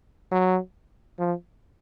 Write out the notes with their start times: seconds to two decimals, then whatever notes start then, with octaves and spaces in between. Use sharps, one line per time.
0.32 F#3
1.19 F3